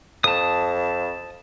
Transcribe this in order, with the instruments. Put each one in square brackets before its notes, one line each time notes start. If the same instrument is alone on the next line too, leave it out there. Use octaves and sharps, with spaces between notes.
[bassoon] F2 [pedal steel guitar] A5 D#6